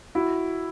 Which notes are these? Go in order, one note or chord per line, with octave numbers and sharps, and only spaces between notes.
E4 F#4